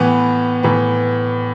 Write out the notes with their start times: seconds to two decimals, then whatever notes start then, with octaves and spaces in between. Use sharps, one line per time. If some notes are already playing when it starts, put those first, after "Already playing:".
Already playing: A2 E3 B3 B4
0.63 A2 E3 B3